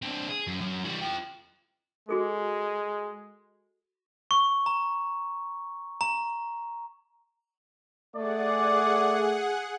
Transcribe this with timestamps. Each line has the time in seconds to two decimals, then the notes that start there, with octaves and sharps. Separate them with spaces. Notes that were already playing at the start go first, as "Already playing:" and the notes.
0.02 C4 D4
0.28 G#4
0.47 F#2
0.61 F#2
0.84 E3 G3
1.01 F4 G5
2.09 G#3 F#4 G#4 A4
4.31 C#6
4.66 A#5
6.01 A#5
8.16 A3 G#4 D5 F#5